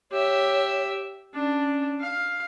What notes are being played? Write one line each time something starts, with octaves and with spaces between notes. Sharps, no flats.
G4 C#5 E5
C#4 D4
F5